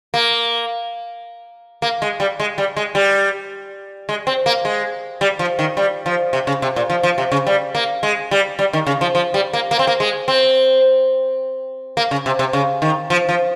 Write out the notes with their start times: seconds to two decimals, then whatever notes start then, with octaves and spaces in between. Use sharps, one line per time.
0.14 A#3
1.82 A#3
2.02 G#3
2.20 G3
2.40 G#3
2.58 G3
2.76 G#3
2.95 G3
4.09 G#3
4.27 C4
4.46 A#3
4.65 G#3
5.21 G3
5.39 F3
5.59 D#3
5.77 G3
6.06 F3
6.33 C3
6.47 C#3
6.62 C3
6.76 A#2
6.90 F3
7.03 F3
7.18 C3
7.32 C#3
7.47 G3
7.75 A#3
8.03 G#3
8.31 G3
8.59 G3
8.73 D#3
8.87 C#3
9.01 F3
9.15 F3
9.34 G3
9.53 A#3
9.71 A#3
9.79 C4
9.87 A#3
10.00 G#3
10.28 C4
11.97 A#3
12.11 C#3
12.26 C3
12.39 C3
12.53 C#3
12.82 D#3
13.10 F3
13.29 F3